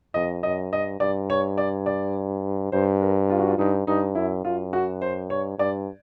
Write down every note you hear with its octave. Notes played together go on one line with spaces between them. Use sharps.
F2 D#5
F#2 D#5
G2 D#5
G2 D5
C#5
D5
D5
G2 C5
A#4
F4
F#4
F4
G2 D#4
G2 D#4
F#2 E4
F#2 F4
F#4
C5
G2 C#5
G2 D5